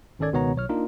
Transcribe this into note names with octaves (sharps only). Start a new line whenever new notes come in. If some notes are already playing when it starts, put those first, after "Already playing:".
G#1 D#3 C#4 A4 D5 G#6
C#2 B2 D#3 B3 C#5 A#5
B1 C#5 F6
A#3 D4 D#4 F4 A#4